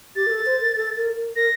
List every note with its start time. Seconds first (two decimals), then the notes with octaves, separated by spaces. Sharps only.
0.16 G4 A6
0.27 A#4
0.31 A4
0.46 C5
0.60 A#4
0.76 A4
0.96 A#4
1.16 A#4
1.35 A#4 A#6